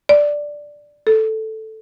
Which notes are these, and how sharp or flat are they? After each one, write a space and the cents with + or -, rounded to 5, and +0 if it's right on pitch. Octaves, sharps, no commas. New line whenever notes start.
D5 +0
A4 +0